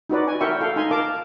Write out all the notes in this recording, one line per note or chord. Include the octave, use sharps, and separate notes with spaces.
D#4 F#4 B4 D5
G#5
E4 F#4 A#4 E5 G5 C#6
A4 F5 G5
D#4 G#5 C6
A#4 F5 A5 D6